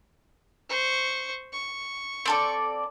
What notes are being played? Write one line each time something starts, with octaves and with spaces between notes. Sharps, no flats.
C5 C#6
C#6
C4 A4 D5